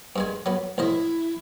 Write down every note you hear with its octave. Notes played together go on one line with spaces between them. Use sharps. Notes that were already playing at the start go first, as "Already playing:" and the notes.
G2 G#3 G#5
F#3 B3
A1 E4 C5 D#5